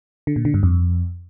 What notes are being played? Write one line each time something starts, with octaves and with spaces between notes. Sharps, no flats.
D3
A#2
D3
G2
F2